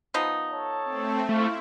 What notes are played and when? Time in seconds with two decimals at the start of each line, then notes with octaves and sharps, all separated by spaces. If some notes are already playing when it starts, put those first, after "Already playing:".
0.14 F3 B3 D#4
0.51 A4 C#5 A5
0.85 A3 C4
1.29 A3 E4 F4 C#6